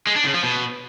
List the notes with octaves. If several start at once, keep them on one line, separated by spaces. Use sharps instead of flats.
G#3
D4
C#3
F3
B2